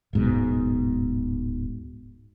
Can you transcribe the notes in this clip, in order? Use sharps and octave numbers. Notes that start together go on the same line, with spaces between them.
D1 G#2 B2